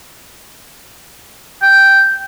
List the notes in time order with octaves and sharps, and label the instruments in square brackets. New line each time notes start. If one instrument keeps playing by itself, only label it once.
[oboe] G5